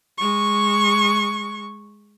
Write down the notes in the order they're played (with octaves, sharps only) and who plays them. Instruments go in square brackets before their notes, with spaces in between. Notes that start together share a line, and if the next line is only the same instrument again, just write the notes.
[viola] G#3 C#6